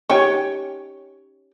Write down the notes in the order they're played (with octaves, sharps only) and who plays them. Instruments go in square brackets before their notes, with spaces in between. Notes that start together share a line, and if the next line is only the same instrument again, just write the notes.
[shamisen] C#4 D#4 G5 [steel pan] G4 C#5 C#6